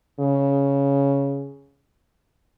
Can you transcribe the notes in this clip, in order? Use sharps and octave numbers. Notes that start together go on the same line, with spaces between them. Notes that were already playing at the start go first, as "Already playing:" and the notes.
C#3